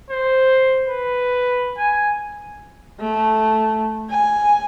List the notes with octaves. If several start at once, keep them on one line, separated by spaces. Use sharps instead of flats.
C5
B4
G#5
A3
G#5